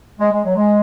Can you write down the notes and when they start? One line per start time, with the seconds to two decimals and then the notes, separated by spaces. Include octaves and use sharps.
0.20 G#3
0.32 G#3
0.44 F#3
0.55 G#3